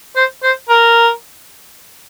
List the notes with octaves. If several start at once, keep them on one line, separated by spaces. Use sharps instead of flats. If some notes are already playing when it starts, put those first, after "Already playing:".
C5
C5
A#4